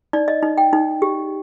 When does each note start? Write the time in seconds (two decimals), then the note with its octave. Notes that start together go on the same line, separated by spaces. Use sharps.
0.13 D#4 D5
0.28 D#5
0.43 D#4
0.57 G5
0.73 D#4
1.02 G4